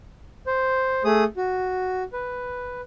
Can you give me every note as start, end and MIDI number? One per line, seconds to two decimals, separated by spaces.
0.47 1.03 72
1.05 1.24 57
1.05 1.24 68
1.05 1.24 87
1.37 2.03 66
2.13 2.81 71